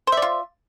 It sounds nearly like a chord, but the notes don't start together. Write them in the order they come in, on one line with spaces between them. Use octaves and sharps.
C5 E5 D5 F4